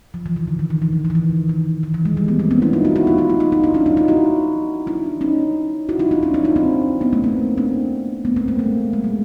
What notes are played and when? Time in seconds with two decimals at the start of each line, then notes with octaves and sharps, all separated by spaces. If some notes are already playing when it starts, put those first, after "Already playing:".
0.14 F3
0.26 E3
0.36 D#3
0.48 D3
0.59 D#3
0.70 D#3
0.82 E3
0.93 E3
1.05 E3
1.10 D#3
1.15 E3
1.49 D#3
1.83 D#3
1.94 E3
2.05 G#3
2.17 G3
2.28 A3 B3
2.39 A#3 C4
2.51 B3 C#4
2.62 D4 E4
2.73 D#4 F4
2.85 E4 F#4
2.96 E4 F#4
3.07 D#4 F4
3.18 E4 F#4
3.30 D#4 F4
3.40 D#4 F4
3.52 D#4 F4
3.64 D4 E4
3.74 C#4 D#4
3.86 D#4 F4
3.97 D#4 F4
4.08 E4 F#4
4.87 D4 E4
5.21 C#4 D#4
5.89 E4 F#4
5.99 D#4 F4
6.11 D4 E4
6.23 C#4 D#4
6.34 D4 E4
6.45 D#4 F4
6.56 C4 D4
7.01 B3 C#4
7.13 A3 B3
7.24 A#3 C4
7.58 C4 D4
8.25 A3 B3
8.36 A#3 C4
8.48 G#3 A#3
8.59 A3
8.93 G#3
9.04 G3